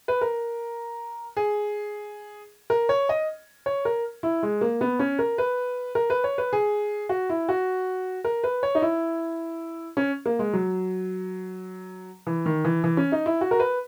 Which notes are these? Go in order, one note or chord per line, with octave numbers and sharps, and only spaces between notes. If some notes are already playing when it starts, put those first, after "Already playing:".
B4
A#4
G#4
A#4
C#5
D#5
C#5
A#4
E4
G#3
A#3
B3
C#4
A#4
B4
A#4
B4
C#5
B4
G#4
F#4
E4
F#4
A#4
B4
C#5
D#4
E4
C#4
A#3
G#3
F#3
E3
D#3
E3
E3
C#4
D#4
E4
F#4
A#4
B4